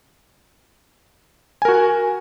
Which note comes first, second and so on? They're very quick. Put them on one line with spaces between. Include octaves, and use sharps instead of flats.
G#5 A#4 F#4